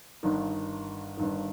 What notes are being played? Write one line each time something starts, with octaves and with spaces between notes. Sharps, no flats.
G1 G2 D#3
G1 G2 D#3